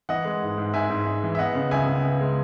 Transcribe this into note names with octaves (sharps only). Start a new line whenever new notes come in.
E3 D#5 F#5
G#3
G#2
G#2
G#2 E5 G#5
G#2
G#2
E3
E5
B3 D#5 F#5
C#3
C#2 E5 G#5
C#3
B3
G#3